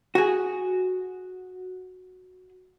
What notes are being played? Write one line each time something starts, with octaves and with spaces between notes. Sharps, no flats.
F#4 G#4